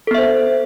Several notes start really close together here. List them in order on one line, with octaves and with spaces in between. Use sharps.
A4 B3 E5 C5